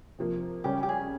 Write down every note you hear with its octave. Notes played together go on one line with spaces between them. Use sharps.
C3 F3 A#3
C#3 G3 C#4 G4
G4
G#4